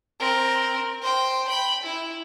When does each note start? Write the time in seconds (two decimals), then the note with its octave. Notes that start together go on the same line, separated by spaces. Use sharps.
0.20 C4 A#4
1.02 C5 G5
1.48 G5 B5
1.83 E4